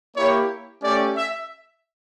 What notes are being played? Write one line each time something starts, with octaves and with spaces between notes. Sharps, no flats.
A#3 E4 G4 C#5
A3 C#4 G4 D5
E5